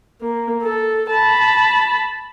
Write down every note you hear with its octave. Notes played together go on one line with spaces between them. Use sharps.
A#3
A4
A5 B5